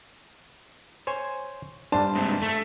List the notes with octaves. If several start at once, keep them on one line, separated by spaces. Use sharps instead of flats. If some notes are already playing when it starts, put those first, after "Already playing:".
C5 C#5 G#5
G2 D4 C5 A5
G#2 C3
A3